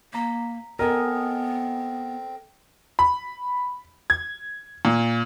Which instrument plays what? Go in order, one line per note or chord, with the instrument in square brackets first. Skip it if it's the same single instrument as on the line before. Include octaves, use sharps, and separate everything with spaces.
[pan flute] A#3 [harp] A#5 B6
[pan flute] B3 [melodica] C4 [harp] A4 D#5 G#5 [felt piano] A#4
[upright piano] B5
G#6
A#2